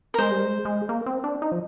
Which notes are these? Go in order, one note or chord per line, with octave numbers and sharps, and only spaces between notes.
A#4
G#3 C5
G3
G#3
G#3
A#3
C4
D4
D#4
F3